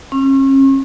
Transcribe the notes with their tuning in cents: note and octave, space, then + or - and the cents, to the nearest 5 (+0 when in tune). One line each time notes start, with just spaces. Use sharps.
C#4 -40